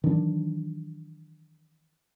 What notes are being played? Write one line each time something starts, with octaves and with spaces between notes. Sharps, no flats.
D#3 E3 F#3 D4